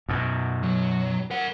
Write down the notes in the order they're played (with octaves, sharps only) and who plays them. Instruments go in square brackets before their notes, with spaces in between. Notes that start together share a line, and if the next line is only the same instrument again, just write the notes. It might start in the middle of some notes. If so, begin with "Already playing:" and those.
[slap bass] F#2 B2
[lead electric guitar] F#3
A#4 F#5